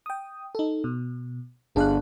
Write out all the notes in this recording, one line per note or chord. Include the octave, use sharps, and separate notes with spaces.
G5 D#6
D#4 A4
B2
G1 D4 G#4 F5 F#6